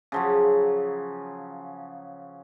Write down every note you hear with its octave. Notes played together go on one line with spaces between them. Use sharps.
C#3 F3 F#3